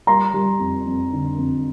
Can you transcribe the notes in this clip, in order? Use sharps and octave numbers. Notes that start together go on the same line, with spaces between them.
G3 A#5 C6
G3
F2
F2
D3
F2